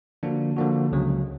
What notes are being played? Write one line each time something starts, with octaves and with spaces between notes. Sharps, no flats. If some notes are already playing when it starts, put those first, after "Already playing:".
D3 F3 A#3 D4 F#4
D3 F3 A#3 D4 F#4
C#2 C#3 F#3